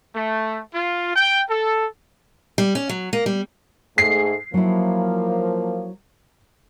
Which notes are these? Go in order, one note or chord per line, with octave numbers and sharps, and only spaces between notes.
A3
F4
G5
A4
G3
C#4
F#3
A#3
G3
G#2 A3 G#4 C7
F3 F#3 A#3 E4